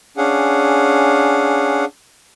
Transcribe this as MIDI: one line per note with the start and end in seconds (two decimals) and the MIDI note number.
0.17 1.85 61
0.17 1.85 62
0.17 1.85 68
0.17 1.85 77
0.17 1.85 78